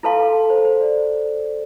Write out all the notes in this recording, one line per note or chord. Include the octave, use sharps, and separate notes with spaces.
E4 A4 B4 F5 A5 C6
A4
A4
C5
C5
D5